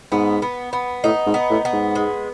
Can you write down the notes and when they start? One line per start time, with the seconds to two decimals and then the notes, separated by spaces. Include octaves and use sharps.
0.12 G#2 B3
0.42 B3
0.73 B3
1.04 A2 D#4
1.26 G#2
1.34 B3
1.50 A2
1.65 B3
1.73 G#2
1.95 G#3